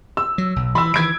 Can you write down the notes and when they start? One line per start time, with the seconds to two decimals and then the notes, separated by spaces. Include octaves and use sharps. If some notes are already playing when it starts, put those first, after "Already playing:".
0.17 E6
0.38 F#3
0.56 B1
0.75 E3 B5 E6
0.94 D#3 E3 G#6 D7